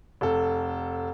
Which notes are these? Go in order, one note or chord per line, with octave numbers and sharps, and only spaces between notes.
F1 A4